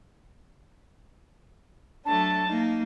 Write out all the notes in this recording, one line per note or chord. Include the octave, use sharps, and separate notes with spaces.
F#3 A3 D4 A5
A#3 D#4